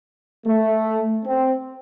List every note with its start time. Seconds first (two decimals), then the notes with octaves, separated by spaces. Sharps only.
0.46 A3
1.25 C4